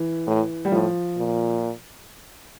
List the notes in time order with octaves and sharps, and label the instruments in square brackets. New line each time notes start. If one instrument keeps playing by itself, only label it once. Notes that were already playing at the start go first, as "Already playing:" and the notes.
Already playing: [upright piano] E3
[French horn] A2
[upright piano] G3
[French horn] A2 [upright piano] F3
[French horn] A#2